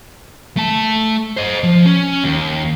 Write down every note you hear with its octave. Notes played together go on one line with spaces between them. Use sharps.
A3 A5
C5 D#5
F3
C#4
D#2